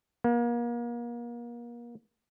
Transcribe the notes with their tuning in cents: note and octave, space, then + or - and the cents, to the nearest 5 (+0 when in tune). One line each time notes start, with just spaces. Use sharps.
A#3 +35